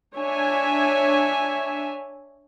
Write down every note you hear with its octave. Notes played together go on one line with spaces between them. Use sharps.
D4 C#5 E5 G#5